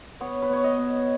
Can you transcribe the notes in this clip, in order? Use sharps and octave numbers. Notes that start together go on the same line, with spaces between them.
B3 C#5
B4
B2 C#5
D#5
B2